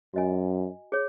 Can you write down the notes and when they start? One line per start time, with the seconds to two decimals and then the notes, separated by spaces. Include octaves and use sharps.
0.14 F#2 F#4 D#5 G#5
0.92 G#4 C#5